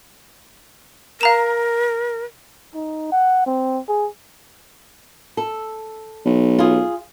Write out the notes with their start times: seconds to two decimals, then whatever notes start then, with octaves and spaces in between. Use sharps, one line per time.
1.21 A#4 F5 A#5 E7
2.74 D#4
3.12 F#5
3.46 C4
3.88 G#4
5.37 A4
6.25 B1
6.59 F4 G#4